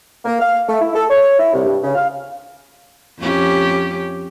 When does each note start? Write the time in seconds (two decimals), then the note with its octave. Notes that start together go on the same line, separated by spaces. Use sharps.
0.25 A#3
0.40 F5
0.68 A3
0.81 E4
0.95 A4
1.09 C#5
1.38 E4
1.53 C2
1.65 G2
1.83 C#3
1.95 F5
3.19 F2 C#4 G4